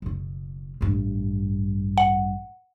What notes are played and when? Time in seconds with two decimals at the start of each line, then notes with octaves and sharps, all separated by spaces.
0.02 F#1 B2
0.81 A1 G2
1.98 F#5